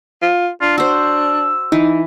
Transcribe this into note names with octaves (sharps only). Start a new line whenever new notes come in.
F4
D4 F4
F#4 C5 E6
E3 D#4